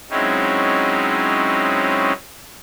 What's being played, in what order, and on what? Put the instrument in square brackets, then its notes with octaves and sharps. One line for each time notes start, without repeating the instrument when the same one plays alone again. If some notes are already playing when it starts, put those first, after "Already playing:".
[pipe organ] F#3 G#3 C4 C#4 D#4 E4